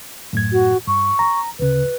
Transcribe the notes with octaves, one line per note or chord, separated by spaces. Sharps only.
F#2 A2 G#6
F#4
G2 C#6
A#5
D2 C#3 B4